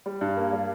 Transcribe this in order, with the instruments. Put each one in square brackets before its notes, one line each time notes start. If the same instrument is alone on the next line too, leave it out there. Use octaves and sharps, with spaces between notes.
[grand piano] G3
G2
A#3
G3